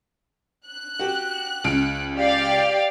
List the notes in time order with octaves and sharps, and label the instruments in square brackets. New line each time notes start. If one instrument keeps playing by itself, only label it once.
[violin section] F#6
[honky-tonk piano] F#4 G4
C#2 F6 D7
[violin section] G4 D5 F5